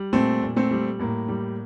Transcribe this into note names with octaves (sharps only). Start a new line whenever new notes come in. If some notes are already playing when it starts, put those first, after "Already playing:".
Already playing: G3
A#2 A3 C4
A#2
A3 C4
G3
A2 A#3
G3